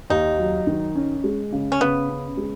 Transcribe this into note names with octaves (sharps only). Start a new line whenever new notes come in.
D#2 D#4
F#3
D#3
C#4
G#3
C#3
C#4
C#3 B3
C#4
G#3